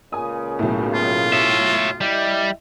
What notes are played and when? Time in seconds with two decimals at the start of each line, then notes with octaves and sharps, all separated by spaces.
0.12 C#2 A#2 C#3 G#5 D#6
0.59 B1 A2
0.94 F4
1.33 C#5 E5
2.01 G3 E4 D#5 E5